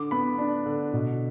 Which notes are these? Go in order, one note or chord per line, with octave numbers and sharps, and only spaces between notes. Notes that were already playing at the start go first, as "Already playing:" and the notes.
Already playing: D3 D6
B3 B5
D4
D3
B2